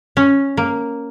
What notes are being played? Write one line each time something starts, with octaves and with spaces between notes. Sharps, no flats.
C#4
A#3